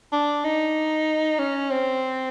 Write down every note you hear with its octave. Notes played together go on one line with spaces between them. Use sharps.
D4
D#4
C#4
C4